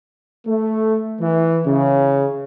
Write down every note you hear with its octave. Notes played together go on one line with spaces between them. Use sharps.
A3
E3
C#3